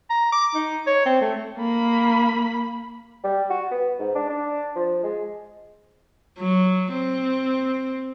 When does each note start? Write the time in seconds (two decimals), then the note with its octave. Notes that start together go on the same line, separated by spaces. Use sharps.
0.10 A#5
0.32 D6
0.54 D#4
0.87 C#5
1.05 C4
1.21 A3
1.58 A#3 B5
3.24 G3
3.50 F#4
3.71 B3
3.99 G#2
4.15 D4
4.29 D4
4.76 F3
5.03 G#3
6.39 F#3
6.93 C4